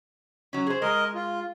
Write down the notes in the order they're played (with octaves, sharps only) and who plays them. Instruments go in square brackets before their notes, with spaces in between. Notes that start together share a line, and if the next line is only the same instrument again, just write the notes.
[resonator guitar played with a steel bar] F#3 C#4
G#4 C5
[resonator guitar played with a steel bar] G#3 [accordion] A#4 D#5
[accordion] F4